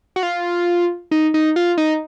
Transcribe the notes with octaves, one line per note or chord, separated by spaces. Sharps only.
F#4
F4
D#4
D#4
F4
D#4